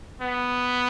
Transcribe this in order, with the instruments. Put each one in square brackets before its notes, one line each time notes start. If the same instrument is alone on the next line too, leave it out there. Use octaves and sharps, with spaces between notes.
[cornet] B3